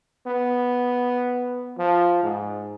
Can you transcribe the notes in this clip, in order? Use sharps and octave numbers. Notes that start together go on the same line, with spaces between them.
B3
F3
G#2